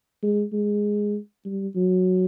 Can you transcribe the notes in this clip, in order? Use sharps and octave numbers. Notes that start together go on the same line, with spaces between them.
G#3
G#3
G3
F#3